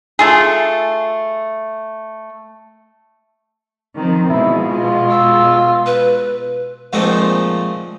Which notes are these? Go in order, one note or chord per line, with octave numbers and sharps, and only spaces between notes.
A3 F4 G#4
D#3 F3 C4
B2 G#3 E4
F4
E6
B4
A#2 F3 G#3 A3 C4 D#4